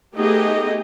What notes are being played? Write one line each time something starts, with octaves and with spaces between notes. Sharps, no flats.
A3 B3 D#4 G4 G#4 D#5